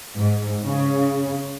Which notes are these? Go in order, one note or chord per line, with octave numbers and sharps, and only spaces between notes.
G#2
C#3